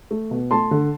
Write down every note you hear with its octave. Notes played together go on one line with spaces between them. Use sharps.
A3
B2
A3 A5 C6
D3